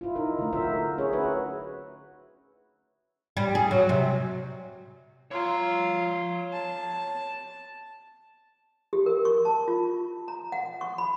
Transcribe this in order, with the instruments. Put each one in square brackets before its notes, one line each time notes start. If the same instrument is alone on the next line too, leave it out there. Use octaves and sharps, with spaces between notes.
[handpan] E4 F4
D#4 E4 A#4
D3 A3
F4 F#4 A#4 C5 E5
C#4 G#4 C#5
F#4 B4 C#5 E5
[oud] G3
G#4
F#3
C3
[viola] F4 [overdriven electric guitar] C#5 A#5
[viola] A5
[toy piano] G4
A#4
C#6
A5
F4
A#5
F#5
C#6
B5